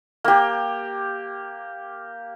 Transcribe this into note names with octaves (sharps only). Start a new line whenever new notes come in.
A#3 G4